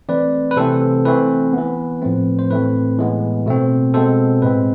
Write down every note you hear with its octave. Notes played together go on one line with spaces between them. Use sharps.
E3 A3 C4 B4 D5
B4
C3 E3 A3 C4 A4 C5
E3 A3 C4 B4
E3 B3
A2 F3 A3 C4
C5
A2 E3 A3 C4 B4
A2 E3 G#3 B3
B2 A3 C4
B2 G#3 C4 A4 C5
A2 G#3 C4 B4